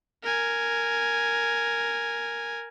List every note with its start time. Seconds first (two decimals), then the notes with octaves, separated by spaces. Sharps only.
0.23 A#4 G#5